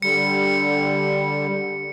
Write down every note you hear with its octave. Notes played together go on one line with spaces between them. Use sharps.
D3 G3 C#7